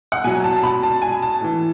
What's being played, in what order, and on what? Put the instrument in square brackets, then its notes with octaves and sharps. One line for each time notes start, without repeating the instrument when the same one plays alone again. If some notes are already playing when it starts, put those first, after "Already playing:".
[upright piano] F#5
B2 F#3 G#5
A5
A5
B5
A5
G#5
A5
A2 E3